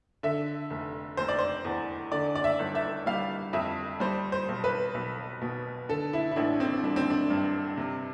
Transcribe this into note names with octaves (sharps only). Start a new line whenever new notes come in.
D3 E5
F1
F1 C5
D5
C5
E2
D3 D5
D5
E5
G1
E5
G3 F5
F2 E5
G3 C5
C5
B1
B4
B1
B2
D3 A4
E4
E4
A1 D4
C4
G3 D4
C4
D4
G2
C3